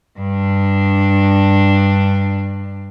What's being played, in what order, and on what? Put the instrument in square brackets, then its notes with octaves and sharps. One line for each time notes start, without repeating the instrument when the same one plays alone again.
[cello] G2 D4